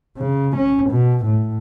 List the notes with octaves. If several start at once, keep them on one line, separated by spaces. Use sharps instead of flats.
C#3
C#4
B2
A2